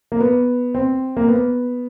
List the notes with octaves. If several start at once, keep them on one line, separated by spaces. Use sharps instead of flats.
A#3
B3
C4
A#3
B3